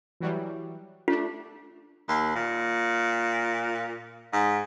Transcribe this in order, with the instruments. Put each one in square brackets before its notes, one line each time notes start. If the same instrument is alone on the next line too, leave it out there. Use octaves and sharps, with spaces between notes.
[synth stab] E3 F#3 G3
[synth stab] A3 D4 [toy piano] F4
[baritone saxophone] D#2
A#2
G#2